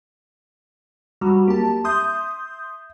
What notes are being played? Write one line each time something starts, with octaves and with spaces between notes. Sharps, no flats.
F#3 G3 F#4
A#3 G4 A5
E5 C6 D#6 G6